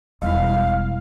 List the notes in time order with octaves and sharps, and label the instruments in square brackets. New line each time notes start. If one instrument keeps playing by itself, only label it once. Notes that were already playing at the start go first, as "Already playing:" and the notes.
[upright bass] E1 [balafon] G3 E4 [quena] F5